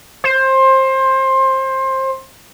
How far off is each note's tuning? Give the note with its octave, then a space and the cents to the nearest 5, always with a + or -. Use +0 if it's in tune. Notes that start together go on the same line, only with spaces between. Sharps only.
C5 +20